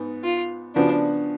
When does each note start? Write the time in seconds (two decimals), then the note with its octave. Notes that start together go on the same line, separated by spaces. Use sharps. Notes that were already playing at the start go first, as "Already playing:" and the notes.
Already playing: G#2 B3
0.24 F4
0.75 C#3 F3 B3 D4 F#4